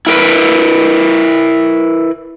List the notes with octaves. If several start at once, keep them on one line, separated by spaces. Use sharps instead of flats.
E4 A#4 B4